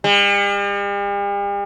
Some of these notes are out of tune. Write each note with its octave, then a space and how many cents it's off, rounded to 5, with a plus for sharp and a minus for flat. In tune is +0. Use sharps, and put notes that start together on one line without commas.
G3 +45